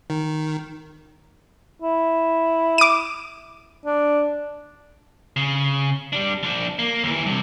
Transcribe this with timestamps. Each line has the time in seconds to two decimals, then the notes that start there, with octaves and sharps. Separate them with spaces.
0.10 D#3
1.82 E4
2.78 D6 D#7
3.85 D4
5.36 C#3
6.13 G3 D4
6.43 F3 D4
6.79 A#3
7.04 D#2 E3
7.26 G2 C3